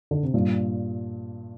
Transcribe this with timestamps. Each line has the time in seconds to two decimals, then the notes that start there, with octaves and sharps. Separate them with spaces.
0.11 D3
0.23 C3
0.34 G2 A#2